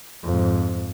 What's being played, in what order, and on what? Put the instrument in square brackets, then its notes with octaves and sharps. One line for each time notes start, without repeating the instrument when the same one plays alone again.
[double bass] F2 G#2